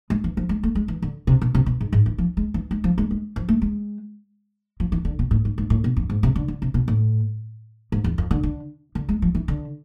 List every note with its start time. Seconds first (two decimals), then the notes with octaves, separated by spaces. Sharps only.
0.10 G#3
0.24 E3
0.37 F3
0.49 G#3
0.63 A3
0.75 G#3
0.88 E3
1.02 D3
1.27 C3
1.42 B2
1.55 C3
1.66 B2
1.81 G#2
1.93 G#2
2.06 E3
2.18 F3
2.37 G#3
2.54 E3
2.71 G#3
2.84 F3
2.98 G#3
3.11 G#3
3.36 F3
3.49 A3
3.62 G#3
4.80 F3
4.92 E3
5.05 D3
5.19 B2
5.31 A2
5.45 G#2
5.58 G#2
5.70 A2
5.84 B2
5.97 F2
6.10 G#2
6.23 C3
6.36 D3
6.48 D3
6.62 C3
6.74 B2
6.88 A2
7.92 G#2
8.04 E2
8.18 F2
8.31 D3
8.43 D3
8.95 D3
9.09 G#3
9.22 F3
9.35 E3
9.48 D3